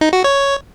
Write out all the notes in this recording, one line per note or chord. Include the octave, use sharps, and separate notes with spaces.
D#4
F#4
C#5